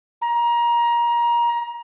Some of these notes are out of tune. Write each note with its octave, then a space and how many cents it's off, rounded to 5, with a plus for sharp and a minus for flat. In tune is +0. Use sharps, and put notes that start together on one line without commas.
A#5 +25